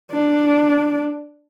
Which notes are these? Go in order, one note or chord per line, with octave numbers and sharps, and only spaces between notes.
D4